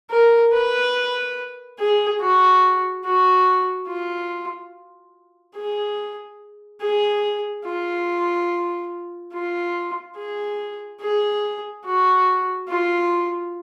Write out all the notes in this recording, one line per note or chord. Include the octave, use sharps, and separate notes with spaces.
A#4
B4
G#4
F#4
F#4
F4
G#4
G#4
F4
F4
G#4
G#4
F#4
F4